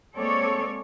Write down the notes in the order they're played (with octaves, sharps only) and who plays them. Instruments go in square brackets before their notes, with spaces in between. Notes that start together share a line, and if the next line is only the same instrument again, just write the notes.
[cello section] G#3 A#3 C4 A4 C#5 D5